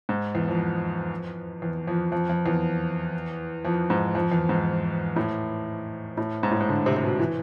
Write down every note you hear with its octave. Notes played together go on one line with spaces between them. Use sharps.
G#2
E2
F2
E2
F2
F2
F2
E2
F2
G#2
F2
E2
G#2
A2
A2
G#2
A2
G#2
D3
C3
C3
B2
E3